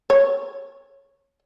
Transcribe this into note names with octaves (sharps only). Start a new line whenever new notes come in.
C#5